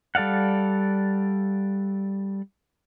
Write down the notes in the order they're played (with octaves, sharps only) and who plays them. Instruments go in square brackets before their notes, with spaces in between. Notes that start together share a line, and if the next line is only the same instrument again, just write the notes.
[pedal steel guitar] G3 A4 D5 F5 F#5